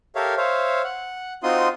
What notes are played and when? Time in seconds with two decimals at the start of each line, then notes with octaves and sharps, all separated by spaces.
0.15 G4 A4 A#4 C#5 E5 F5
0.37 C5 C#5 E5 F5
0.84 F#5
1.43 C4 D#4 F4 F#4 C6 D#6